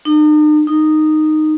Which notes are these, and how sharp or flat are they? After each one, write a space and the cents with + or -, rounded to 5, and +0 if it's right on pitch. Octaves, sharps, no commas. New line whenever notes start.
D#4 -45
D#4 -10